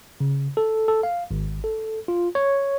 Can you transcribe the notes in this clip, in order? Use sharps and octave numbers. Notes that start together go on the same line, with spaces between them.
C#3
A4
A4
F5
G#1
A4
F4
C#5